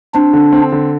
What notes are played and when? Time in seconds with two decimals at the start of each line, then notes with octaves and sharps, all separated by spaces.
0.15 C4 D4
0.33 D3
0.52 C4
0.72 D3